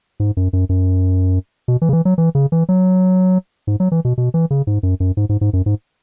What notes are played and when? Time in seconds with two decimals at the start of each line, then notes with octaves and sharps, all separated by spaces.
0.20 G#2
0.37 F#2
0.53 F#2
0.69 F#2
1.68 B2
1.82 E3
1.89 C#3
1.93 E3
2.05 F#3
2.18 E3
2.35 C#3
2.52 E3
2.69 F#3
3.67 G#2
3.80 F#3
3.92 E3
4.05 B2
4.18 B2
4.34 E3
4.51 C#3
4.67 G#2
4.83 F#2
5.00 F#2
5.17 G#2
5.29 G#2
5.41 G#2
5.53 F#2
5.66 G#2